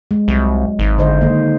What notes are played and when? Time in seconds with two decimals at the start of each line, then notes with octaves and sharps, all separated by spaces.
0.11 G#3
0.28 C2 F#3
0.79 G#1
0.98 D3 C5 D#5
1.21 D#3 A#3